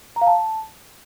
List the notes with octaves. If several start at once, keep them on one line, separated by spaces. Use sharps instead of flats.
A#5
F5
A5